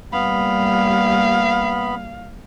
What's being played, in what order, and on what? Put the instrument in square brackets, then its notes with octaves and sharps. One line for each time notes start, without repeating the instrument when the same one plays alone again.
[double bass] G3 A#3 [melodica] B3 B5 [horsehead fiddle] F5